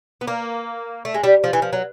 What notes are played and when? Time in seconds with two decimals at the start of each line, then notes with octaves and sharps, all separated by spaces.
0.21 B3
0.27 A#3
1.05 A3
1.14 G#3
1.24 G3
1.44 F3
1.53 E3
1.62 F3
1.73 F#3